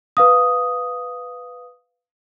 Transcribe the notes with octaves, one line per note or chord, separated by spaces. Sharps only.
B4 F5 D#6